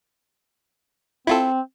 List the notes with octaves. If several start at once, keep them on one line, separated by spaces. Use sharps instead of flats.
C4 E4 F4 A4